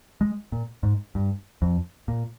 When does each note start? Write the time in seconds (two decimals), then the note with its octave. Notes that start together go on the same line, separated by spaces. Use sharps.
0.21 G#3
0.52 A#2
0.83 G#2
1.15 G2
1.62 F2
2.08 A#2